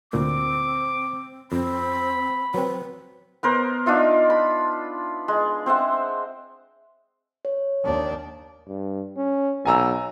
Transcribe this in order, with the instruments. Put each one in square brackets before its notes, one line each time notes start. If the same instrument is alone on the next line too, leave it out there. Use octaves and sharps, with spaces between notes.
[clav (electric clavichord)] D2 A#2 [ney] C4 [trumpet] D6
[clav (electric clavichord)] F2 [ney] C4 [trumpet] B5
[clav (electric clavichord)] F#3 C4 [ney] B4
[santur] B3 A#4 C5
D4 D#4 F4 E5
B5
G#3
C4 C5 E5 F#5
[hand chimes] C#5
[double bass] D#2 D4
[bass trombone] G2
C#4
[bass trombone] B1 [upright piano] G#5 A#5 E6